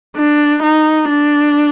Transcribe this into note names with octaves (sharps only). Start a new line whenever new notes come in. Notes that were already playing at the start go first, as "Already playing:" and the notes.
D4
D#4
D4